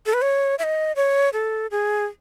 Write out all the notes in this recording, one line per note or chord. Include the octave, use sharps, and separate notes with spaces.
A4
B4
C#5
E5
D#5
C#5
A4
G#4